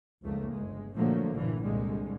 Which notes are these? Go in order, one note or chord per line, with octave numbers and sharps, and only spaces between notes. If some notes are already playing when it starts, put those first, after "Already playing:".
F1 C#2 A3 A#3
G1 G#3
A#2 D3 F3 F#3 A3 A#3
A#1 G2 A#2 D3 E3
C2 A#2 D3 G3 G#3